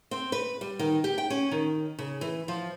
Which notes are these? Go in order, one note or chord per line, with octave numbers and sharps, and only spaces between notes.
C4
B4
G3
D#3
G4
G5
C#4
D#3
C#3
E3
F3